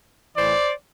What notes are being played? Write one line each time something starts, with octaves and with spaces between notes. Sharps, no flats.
A2 E3 C5 D5